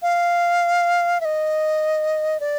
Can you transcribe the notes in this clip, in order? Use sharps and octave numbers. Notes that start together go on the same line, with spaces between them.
F5
E5
D#5
D5